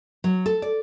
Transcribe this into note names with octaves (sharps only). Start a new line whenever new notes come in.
F#3
A4
D5